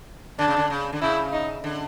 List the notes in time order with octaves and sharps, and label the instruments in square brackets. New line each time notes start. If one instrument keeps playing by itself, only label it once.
[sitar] D3 [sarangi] D4
[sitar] C#3
D3
C#3
D3
[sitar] C#3 [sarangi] E4
[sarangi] D#4
[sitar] D3